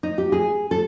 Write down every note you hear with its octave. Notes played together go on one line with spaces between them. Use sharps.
D#4
G4
G#4
A4